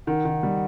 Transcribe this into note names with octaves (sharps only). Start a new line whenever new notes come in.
D#3 F#5
D#3
G3